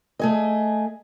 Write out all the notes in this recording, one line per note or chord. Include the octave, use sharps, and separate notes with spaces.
A3 G#4 D#5